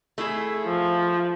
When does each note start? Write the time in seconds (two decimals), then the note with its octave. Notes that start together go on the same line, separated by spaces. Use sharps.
0.18 A3 E4 G#4
0.64 F3